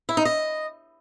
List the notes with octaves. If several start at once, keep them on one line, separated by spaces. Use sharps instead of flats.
E4
D#4
D#5